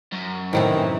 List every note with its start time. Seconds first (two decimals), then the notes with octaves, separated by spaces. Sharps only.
0.13 F#2
0.53 A2 C3 D#3 E3 A3